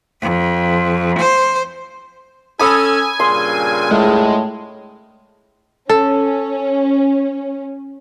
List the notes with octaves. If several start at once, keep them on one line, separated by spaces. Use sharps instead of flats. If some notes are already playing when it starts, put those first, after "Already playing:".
F2
C5
C#4 A4 G#5 B5 D#6 E6
G2 A#2 C#3 C6
A2 G#3
C#4 A4